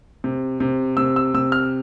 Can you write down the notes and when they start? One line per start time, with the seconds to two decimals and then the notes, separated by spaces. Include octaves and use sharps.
0.24 C3
0.60 C3
0.97 C3 E6
1.16 E6
1.34 C3 E6
1.52 F6